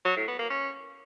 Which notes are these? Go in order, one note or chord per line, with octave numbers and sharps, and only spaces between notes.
F#3
A2
B3
A#3
C#4